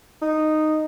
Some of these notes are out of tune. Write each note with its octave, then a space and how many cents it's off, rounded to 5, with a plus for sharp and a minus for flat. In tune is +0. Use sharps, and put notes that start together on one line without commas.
D#4 -10